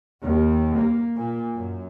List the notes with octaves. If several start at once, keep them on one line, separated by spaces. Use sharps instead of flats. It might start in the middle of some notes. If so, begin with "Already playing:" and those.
D#2
A#3
A#2
F#2